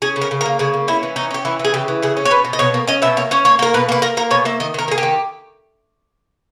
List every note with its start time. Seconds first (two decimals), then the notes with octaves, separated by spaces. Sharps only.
0.02 C#4 G#4
0.16 C#3
0.21 A#4
0.31 C#3
0.41 A#4
0.45 A#3
0.59 C#3 G#4
0.74 A#3
0.88 C#4 E4
1.03 E3
1.16 C#4 D#4
1.31 C#4 G4
1.45 E3 E4
1.59 E3
1.65 G#4
1.74 C#3 G4
1.88 E3
2.02 C#3 G#4
2.17 C#4
2.25 C#5
2.31 B2 B4
2.45 B2
2.53 D#5
2.59 B2 C#5
2.74 A#3
2.87 C#4 D#5
3.02 B2 E5
3.17 A#3 C#5
3.31 C#4 C#5
3.45 A#3 C#5
3.59 A#3 A#4
3.74 B2 B4
3.89 A#3 B4
4.02 A#3 A#4
4.17 A#3 A#4
4.31 B2 C#5
4.45 A#3 E5
4.60 D#3 D#5
4.74 D#3 A#4
4.88 A#3 G#4
4.98 G4
5.03 D#3